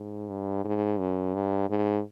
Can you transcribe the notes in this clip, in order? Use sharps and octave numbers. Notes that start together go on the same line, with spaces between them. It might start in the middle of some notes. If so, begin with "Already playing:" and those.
Already playing: G#2
G2
G#2
F#2
G2
G#2